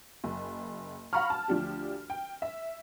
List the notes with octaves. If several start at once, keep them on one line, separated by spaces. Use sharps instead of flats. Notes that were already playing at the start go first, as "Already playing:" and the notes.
F#1
F5 F#5 A#5 B5 C#6 F6
A5
D2 F3 D4 G4
G5
E5